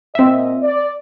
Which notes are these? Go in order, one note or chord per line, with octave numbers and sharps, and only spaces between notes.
A#2 C4 D#5 E5
D5